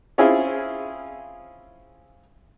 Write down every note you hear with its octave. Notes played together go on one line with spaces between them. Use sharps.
C4 C#4 E4 F4 G#4